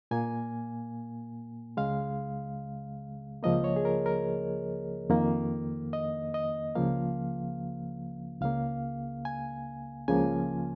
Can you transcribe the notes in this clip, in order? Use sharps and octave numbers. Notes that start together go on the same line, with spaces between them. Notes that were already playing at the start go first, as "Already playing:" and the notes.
A#2 A#3 G#5
C#2 C#3 G#3 F5
C#2 C#3 F3 A#3 D#5
C#5
G#4
A#4
A#4
F2 D#3 A#3
D#5
D#5
C#2 C#3 F3 A#3 F5
C#2 C#3 A#3 F5
G#5
C#2 C#3 F3 A#3 G#5